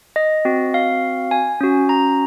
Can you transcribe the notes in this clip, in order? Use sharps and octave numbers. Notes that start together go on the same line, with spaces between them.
D#5
C4 F#4
F5
G#5
C#4 F#4
A#5